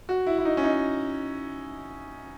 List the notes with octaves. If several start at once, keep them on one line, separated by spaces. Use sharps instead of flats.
F#4
E4
E4
D#4
C#4
D#4